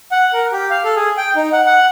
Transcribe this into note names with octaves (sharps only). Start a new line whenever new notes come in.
F#5
A#4
G4
F5
A4
G#4
G5
D#4
F#5
F#5